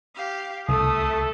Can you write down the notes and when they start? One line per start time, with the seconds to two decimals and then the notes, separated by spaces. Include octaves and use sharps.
0.15 G4 F5
0.69 C2 A3 A4 D#6